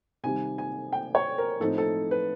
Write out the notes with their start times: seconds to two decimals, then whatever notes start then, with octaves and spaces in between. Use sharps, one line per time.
0.23 C3 D#3 G3 G#5
0.58 G#5
0.93 G5
1.15 C#5
1.38 A#4
1.60 A2 F3 A3 C4 D#4 A4
1.78 A4
2.11 B4